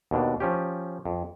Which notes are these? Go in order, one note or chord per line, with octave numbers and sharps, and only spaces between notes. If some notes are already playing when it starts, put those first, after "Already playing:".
D#2 B2 D4
F3 C#4 G4
F2